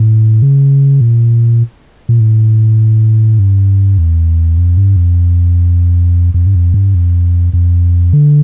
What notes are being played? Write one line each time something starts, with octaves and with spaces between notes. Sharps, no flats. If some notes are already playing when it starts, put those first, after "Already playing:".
Already playing: A2
C#3
A#2
A#2
A2
G2
E2
F2
G2
F2
F2
G2
F2
G2
F2
F2
D3